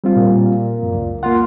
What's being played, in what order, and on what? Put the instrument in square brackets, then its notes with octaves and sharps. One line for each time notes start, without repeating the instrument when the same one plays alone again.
[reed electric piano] G3 C4 F4
[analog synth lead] A#2
[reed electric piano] F#2
C#2
[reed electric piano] A#3 F#5 [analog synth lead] F4